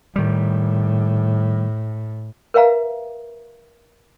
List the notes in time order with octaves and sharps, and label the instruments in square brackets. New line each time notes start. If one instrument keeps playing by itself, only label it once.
[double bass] A2 [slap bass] D#3 G3
[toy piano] A#4 B4 E5 F5 A#5